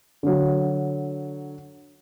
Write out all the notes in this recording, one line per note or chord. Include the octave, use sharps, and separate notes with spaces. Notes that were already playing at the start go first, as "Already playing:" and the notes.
D3 F#3